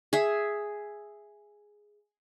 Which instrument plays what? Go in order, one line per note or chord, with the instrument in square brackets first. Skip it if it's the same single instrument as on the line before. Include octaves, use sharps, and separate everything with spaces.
[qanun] G#4 E5